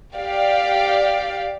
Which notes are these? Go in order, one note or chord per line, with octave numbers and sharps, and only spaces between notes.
G4 D5 F5